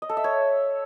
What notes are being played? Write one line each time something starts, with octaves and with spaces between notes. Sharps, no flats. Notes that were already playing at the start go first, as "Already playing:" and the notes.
D#5
A4
E5
C#5